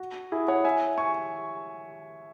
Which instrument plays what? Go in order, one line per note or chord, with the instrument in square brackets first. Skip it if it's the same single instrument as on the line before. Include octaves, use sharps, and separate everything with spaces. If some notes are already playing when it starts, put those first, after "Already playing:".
Already playing: [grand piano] F#4
E4 G#4
C#5 F#5
E5 G#5
G#5 C#6